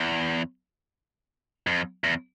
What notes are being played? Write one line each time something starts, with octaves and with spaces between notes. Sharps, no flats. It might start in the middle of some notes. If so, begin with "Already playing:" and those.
Already playing: E2
F2
E2